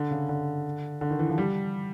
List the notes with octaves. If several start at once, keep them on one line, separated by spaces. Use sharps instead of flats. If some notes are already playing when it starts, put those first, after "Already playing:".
Already playing: D3
C#3
D3
D3
D#3
E3
F3
G3